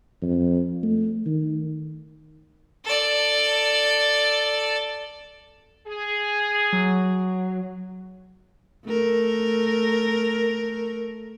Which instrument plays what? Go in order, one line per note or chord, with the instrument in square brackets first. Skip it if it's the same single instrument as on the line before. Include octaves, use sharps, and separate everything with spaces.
[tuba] F2
A3
D#3
[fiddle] A4 D5
[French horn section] G#4
[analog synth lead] F#3
[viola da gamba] A3 A#4